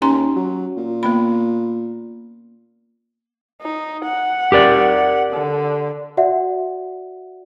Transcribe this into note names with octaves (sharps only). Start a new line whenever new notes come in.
D#2 C#4 A#5 C6
F#3
A#2
A#3 B3 B5
D#4
F#5
G4 A#4 D5
D3
F#4 D5 E5 F#5